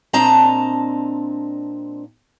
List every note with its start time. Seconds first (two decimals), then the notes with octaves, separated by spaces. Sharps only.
0.13 A#2 C4 D4 D#5 A5 A#5